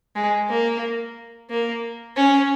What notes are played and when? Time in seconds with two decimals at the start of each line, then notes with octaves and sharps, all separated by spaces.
0.16 G#3
0.49 A#3
1.50 A#3
2.17 C#4